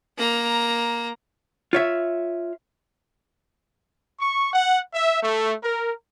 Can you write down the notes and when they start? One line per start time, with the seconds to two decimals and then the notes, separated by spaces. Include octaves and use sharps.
0.18 A#3 A#5
1.73 F4 C#5 E5
4.20 C#6
4.52 F#5
4.92 E5
5.21 A3
5.62 A#4